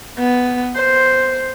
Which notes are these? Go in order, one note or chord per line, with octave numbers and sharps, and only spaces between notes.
B3
C5